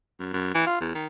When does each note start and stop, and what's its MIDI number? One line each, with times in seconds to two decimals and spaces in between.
0.20 0.31 42
0.33 0.53 42
0.54 0.63 52
0.67 0.79 65
0.81 0.93 40
0.95 1.07 51